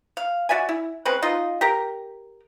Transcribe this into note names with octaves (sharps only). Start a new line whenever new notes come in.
F5
F#4 D5 E5 G#5
E4
G#3 C4 C#4 B4
D#4 F4 D#5
G4 A#4